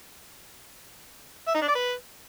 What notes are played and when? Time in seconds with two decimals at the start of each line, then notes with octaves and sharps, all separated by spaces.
1.48 E5
1.55 D#4
1.61 D4
1.68 D5
1.75 B4